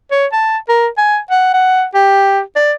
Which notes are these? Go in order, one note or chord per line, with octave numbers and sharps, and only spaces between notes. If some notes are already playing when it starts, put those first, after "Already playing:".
C#5
A5
A#4
G#5
F#5
F#5
G4
D5